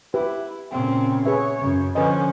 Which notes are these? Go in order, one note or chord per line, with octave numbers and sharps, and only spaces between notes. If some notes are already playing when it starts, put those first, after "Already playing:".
E4 G4 B4
A#2 C#3 C4
G#4 B4 C#5 E5
F#2 C#3
D3 F3 C#4 B4 D#5